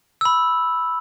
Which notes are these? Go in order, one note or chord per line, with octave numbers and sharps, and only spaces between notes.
B5 E6